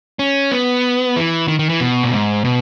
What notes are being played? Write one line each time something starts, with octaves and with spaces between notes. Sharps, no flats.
C#4
B3
E3
D#3
D#3
E3
B2
A#2
G#2
B2